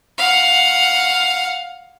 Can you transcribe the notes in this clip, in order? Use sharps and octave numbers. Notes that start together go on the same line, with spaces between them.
F5 F#5